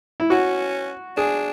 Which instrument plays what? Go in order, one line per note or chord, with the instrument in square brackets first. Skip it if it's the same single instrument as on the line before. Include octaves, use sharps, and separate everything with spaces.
[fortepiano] E4
[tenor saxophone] C#4 [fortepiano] F#4
[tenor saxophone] D4 [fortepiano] G#4